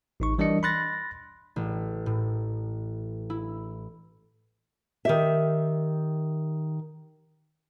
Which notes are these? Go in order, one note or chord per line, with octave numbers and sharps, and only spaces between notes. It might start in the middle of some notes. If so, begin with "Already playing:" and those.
A1 D#4 C#6
E3 G3 D4 A#4 D#5 C#7
B5 C6 F#6 A6 A#6
A1
A2
E4
D#3 G4 E5